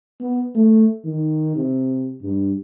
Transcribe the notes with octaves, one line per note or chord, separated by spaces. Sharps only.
B3
A3
D#3
C3
G2